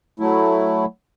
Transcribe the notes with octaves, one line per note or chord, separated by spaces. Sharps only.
F#3 A3 E4